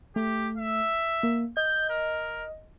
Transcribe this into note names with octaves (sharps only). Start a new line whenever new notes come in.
A3 G4
E5
A#3
D#5 G6
A#4